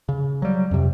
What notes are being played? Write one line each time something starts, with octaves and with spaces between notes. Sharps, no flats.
C#3
F#3 G3
F2 C3